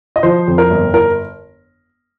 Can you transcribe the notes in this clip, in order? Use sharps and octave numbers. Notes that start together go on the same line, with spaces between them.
D#5
F3 C5
F2
A#4
G1
A#4